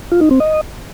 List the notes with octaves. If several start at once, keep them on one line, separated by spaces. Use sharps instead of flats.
F4
D#4
C4
D#5